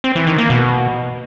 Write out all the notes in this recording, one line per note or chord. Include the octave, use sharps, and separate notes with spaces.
C4
E3
D#3
A#3
B2